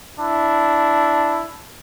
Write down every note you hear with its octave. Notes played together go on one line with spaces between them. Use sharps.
D4 E4